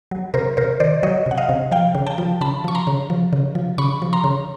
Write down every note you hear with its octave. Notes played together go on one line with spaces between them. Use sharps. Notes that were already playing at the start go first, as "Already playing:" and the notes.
F#3
C3 A#4 C5
C3 A#4 C5
D#3 C5 D5
F#3 C#5 D#5
C3 F#5
D#5 F5
C3
F3 F5 G5
C#3
G5 A5
F3
C#3 A5 B5
F3 C#6
A#5 C6
C#3
F3
C#3
F3
C#3 B5 C#6
F3
A#5 C6
C#3